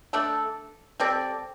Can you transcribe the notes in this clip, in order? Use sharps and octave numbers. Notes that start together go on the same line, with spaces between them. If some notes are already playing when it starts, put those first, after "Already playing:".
A3 D4 A4
G3 C4 A4 D5